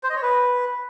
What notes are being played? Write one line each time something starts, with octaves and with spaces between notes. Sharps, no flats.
C5
D#5
C#5
B4